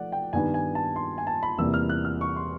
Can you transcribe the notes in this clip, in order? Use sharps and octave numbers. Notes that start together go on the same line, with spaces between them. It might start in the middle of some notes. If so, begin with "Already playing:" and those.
Already playing: F3 A3 D5 F#5
G5
G2 D#3 G3 B3 G#5
G#5
A5
C6
G#5
A5
B5
E2 C3 E3 G3 A#3 E6
F6
F#6
F6
C#6
C6